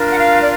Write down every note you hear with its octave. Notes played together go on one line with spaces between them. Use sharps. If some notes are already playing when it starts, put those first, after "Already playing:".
Already playing: D4 F4 A#4
F#5
F5
D5